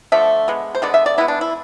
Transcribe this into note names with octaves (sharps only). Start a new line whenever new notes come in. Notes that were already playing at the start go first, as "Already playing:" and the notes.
D3 F3 A3 E5
D3 G#3 B3
C5
D3 G#3 B3 D5
E5
D5
E3 G#3 B3 E4
D4
E4